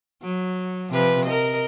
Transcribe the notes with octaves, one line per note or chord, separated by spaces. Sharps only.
F#3
C3 F3 B4
A#4 D#5